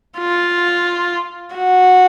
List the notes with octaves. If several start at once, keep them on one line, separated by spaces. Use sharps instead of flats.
F4
F#4